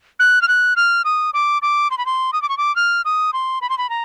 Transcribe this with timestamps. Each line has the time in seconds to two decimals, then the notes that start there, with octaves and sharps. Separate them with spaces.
0.19 F#6
0.42 F6
0.48 F#6
0.76 F6
1.05 D#6
1.34 D6
1.62 D6
1.91 C6
1.98 B5
2.06 C6
2.33 D#6
2.42 D6
2.49 C#6
2.58 D6
2.76 F6
3.05 D#6
3.33 C6
3.62 B5
3.70 C6
3.78 B5
3.90 A#5